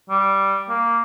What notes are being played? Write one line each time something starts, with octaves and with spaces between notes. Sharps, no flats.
G3
A#3